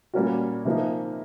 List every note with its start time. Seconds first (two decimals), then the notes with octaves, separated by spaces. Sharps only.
0.14 A#2 G3 A#3 C#4 F#4
0.65 C3 F3 A#3 D#4